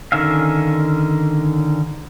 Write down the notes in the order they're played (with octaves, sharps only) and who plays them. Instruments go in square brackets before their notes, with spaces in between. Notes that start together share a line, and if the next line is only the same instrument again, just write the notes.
[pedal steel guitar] D3 D#3 C#4 E5 F5